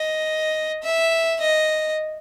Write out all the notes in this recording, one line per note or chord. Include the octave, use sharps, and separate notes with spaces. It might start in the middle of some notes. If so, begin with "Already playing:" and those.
Already playing: D#5
E5
D#5